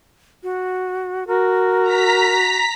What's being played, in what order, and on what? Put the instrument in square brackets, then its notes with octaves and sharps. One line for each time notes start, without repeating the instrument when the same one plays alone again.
[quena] F#4
[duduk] F#4 [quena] A#4
[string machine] A#5 B6